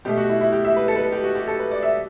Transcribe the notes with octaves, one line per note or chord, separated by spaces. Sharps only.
B2 A3 G4
F#4
E4
E4
G4
E5
B4
A4
B4
A4
G4
F#4
G4
A4
B4
D5
E5